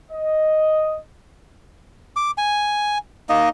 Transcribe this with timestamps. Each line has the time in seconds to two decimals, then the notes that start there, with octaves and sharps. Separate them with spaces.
0.11 D#5
2.16 D6
2.38 G#5
3.29 A#3 D#4 D#5